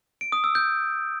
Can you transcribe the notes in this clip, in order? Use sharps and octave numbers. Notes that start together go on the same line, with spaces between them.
D7
D#6
E6
G6